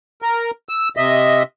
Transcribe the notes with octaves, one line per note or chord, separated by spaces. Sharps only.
A#4
E6
C3 D#5 E5